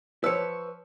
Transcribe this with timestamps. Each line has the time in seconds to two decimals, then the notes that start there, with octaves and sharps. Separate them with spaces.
0.24 F3 B4 C#5 E6